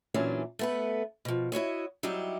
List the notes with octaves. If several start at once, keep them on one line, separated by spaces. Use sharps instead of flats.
E2 A#2 E3 F#3 C#4 D4
A3 B3 B4
B2 F3
E4 F#4 C#5 D#5
F#3 G3 D#4 E4 G4